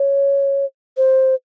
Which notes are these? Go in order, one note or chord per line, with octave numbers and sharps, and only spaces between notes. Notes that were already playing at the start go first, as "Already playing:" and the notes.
Already playing: C#5
C5